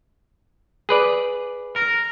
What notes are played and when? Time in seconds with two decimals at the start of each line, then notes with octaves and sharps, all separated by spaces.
0.89 G#4 B4 D5
1.76 A#4